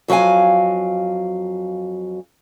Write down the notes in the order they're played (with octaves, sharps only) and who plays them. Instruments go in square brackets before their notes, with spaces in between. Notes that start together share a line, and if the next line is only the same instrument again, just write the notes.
[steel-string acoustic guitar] F2 F#3 D#4 F5 G#5